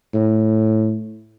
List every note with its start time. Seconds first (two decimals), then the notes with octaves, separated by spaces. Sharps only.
0.14 A2